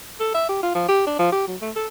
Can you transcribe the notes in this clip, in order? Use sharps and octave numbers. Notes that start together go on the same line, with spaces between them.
A4
E5
G4
F4
F3
G4
D4
F3
G4
F#3
A3
A4